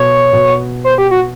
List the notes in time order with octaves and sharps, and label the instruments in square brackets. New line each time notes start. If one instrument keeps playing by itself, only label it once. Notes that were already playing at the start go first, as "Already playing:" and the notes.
Already playing: [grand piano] B2 [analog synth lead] C#5
[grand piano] B2
[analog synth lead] C5
G4
F#4